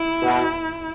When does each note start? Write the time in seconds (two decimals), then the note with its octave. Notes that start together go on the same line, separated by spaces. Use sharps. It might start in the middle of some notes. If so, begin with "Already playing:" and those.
Already playing: E4
0.22 B2